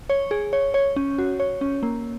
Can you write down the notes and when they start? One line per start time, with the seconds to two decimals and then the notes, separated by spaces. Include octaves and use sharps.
0.10 C#5
0.31 G#4
0.53 C#5
0.74 C#5
0.96 C#4
1.18 F#4
1.40 C#5
1.61 C#4
1.83 A#3